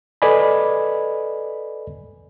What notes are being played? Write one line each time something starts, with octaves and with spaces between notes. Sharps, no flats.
A4 B4 D5 D#5 G#5 B5